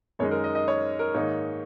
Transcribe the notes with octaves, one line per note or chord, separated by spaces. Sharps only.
F#2 D#3 G#3 D#4 C#5
A#4
D#5
D#5
C#5
A#4
G#2 D#3 A#3 D#4 C#5